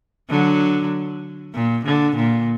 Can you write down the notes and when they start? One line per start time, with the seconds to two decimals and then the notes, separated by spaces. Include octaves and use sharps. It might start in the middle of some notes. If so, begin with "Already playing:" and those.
0.30 D3 F#3
1.54 A#2
1.86 D3
2.16 A#2